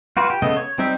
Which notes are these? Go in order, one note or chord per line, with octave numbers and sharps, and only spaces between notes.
F4 F#4 B4
G4
C#3 A3 B3 D#5
C#5
G3 C4 D#4 G4 E5